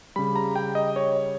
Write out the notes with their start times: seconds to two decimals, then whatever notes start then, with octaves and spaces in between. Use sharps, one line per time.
0.16 C#3 G3 B5
0.36 A#5
0.56 G5
0.75 D#5
0.96 C#5